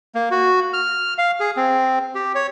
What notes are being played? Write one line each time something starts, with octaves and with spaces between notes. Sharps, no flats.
A#3
F#4
F6
F5
G#4
C4
G4
C#5